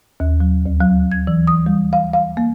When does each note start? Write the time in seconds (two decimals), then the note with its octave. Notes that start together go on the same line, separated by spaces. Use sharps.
0.20 D#2
0.40 F#3
0.66 D2
0.80 F#3
1.12 G#6
1.27 E3
1.47 D#6
1.66 G3
1.93 F5
2.13 F5
2.37 A#3